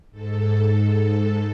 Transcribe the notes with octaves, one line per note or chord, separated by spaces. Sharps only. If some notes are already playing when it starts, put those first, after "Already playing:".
G#2 A4